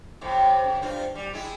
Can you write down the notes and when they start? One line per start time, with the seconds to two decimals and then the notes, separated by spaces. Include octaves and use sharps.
0.21 F2 A2 C3
0.64 C#3
0.82 G2 C4 F4
1.15 G3
1.33 G#3 E4